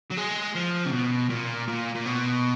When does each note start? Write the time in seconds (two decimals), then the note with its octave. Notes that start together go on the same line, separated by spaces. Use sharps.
0.10 F#3
0.17 G#3
0.55 F3
0.85 C#3
0.92 B2
1.30 A#2
1.68 A#2
1.95 A#2
2.06 B2